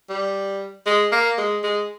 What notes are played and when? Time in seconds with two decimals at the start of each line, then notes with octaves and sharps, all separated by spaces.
0.09 G3
0.86 G#3
1.12 A#3
1.38 G#3
1.64 G#3